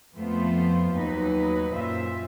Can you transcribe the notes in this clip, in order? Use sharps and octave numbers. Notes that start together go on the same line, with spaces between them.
F2 F3 A3 B3 F4 C5
D#2 F#3 D#4 B4
F#2 A#2 F4 C5 E5